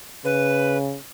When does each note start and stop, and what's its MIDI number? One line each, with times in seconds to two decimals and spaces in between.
0.25 0.97 49
0.25 0.77 71